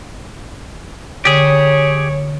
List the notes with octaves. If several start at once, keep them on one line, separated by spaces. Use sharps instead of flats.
D3 G4 G#4 C#5